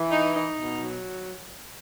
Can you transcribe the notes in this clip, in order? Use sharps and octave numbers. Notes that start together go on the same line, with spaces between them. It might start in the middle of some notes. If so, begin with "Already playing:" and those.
Already playing: E3
D#4
D#4
B2
F#3